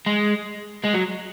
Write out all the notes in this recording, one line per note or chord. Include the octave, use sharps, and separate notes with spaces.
G#3
G#3
F#3